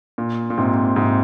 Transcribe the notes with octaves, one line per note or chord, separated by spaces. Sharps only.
A#2
A#2
G#2 C3
G#2 C3